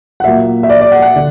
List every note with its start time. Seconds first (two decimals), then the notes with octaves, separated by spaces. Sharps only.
0.20 F#5
0.24 A#2 F#3 A#3 E5
0.63 E5
0.70 D5
0.81 D5
0.92 F#5
1.02 F#5
1.16 D3